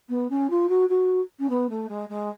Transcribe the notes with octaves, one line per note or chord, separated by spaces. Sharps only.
B3
C#4
F4
F#4
F#4
C#4
B3
A3
G#3
G#3